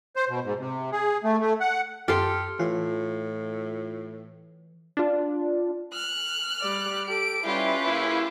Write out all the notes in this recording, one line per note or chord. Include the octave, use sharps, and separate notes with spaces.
C5
B2
G#2
C3
G#4
A3
A3
F#5
F#2 G4 A4 C6 F6
A2 E3 F4
D4 F4
F6 F#6
G3 D5
G4 A4 D7
G3 C#4 E4 F4 G4 B4
C#3 A#3 E4